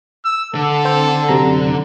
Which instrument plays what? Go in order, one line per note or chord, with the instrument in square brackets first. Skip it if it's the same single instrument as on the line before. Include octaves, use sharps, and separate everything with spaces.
[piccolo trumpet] E6
[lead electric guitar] D3 [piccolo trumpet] A4
[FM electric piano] C4 C5
F#2 C3 A#5